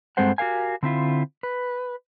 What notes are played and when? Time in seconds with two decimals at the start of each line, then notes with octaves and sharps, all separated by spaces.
0.17 G2 G#3 C4 A4 C5 F#5
0.38 F#4 G4 A#4 F5 G#5
0.83 D3 C4 E4 F4
1.43 B4